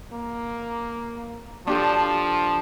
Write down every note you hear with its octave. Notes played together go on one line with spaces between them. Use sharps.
A#3
F3 D4 G4 A4